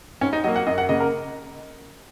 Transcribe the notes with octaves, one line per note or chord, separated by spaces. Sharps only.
G#2 C#4
D#4
F#3 A#3 D#5
F#5
F#2 D#5
F#5
C#3 A#3 D#5
A#4